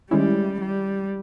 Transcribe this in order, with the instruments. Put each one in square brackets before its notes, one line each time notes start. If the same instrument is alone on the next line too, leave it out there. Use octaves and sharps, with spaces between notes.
[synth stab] D#3 G#3 C#4 E4 [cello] G3
[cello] G3